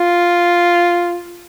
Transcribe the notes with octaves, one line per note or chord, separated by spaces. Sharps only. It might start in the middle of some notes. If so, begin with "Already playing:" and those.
Already playing: F4